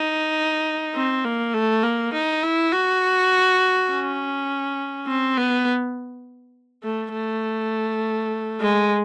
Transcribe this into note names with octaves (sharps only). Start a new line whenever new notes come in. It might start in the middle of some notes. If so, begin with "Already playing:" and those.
Already playing: D#4
C4
A#3
A3
A#3
D#4
E4
F#4
C#4
C4
B3
A3
A3
G#3